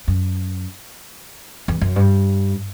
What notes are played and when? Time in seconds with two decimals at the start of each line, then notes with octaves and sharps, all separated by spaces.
0.08 F#2
1.68 E2
1.81 F#2
1.96 G2